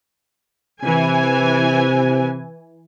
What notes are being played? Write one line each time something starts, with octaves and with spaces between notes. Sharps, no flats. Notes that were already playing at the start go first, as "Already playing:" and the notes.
C3 E3 G#5